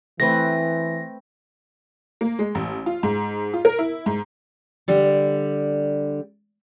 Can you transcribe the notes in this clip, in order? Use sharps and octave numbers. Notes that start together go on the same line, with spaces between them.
E3 A3 C4 B4 A#6
A#3
G#3
A1
F4
G#2
F4
A#4
E4
G#2
D3 G3